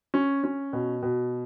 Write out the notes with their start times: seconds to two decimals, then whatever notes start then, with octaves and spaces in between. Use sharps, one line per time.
0.14 C#4
0.44 C#4
0.73 B2
1.03 B2